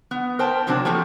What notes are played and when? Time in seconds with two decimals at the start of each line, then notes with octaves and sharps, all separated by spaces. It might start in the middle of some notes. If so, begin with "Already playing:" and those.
0.11 B3
0.39 A#4 C5 G5 A5
0.67 A2 C3 F#3 C4 D4 A5
0.85 F3 A3 A#3 F4 G4